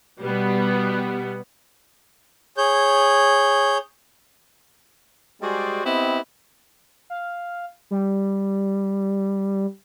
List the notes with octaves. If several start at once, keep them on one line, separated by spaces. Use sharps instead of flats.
B2 G3 B3
G#4 C#5 G6
G3 G#3 F#4 G#4 C5 D5
B3 C4 E4 G4 D#5
F5
G3